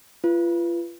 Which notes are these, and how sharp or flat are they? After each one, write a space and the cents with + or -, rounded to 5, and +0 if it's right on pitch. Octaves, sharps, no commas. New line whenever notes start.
F4 -35 B4 +0